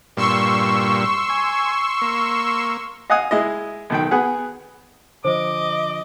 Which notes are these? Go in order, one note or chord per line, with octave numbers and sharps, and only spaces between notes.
G2 A#2 C6 C#6 E6
G#5
A#3
D#5 F5 F#5 G#5 D#6
G#3 E4 D#5
B1 D#3 G5
B3 G#4 F#5
D3 F3 C5 D#5 D6